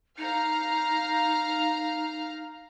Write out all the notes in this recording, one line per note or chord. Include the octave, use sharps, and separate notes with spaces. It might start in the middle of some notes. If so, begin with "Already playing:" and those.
D#4 F5 A#5 F6